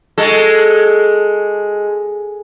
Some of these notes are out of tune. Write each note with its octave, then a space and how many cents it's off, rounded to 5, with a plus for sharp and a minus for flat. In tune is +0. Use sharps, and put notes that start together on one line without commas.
G#3 +0 F#4 +0 A4 +0